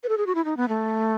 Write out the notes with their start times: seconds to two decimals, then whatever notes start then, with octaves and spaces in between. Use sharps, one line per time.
0.03 B4
0.09 A4
0.17 G#4
0.26 F#4
0.35 E4
0.45 D#4
0.57 B3
0.69 A3